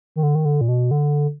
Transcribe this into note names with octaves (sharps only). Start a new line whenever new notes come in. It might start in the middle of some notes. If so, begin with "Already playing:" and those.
D#3
D3
D#3
D3
A#2
B2
D3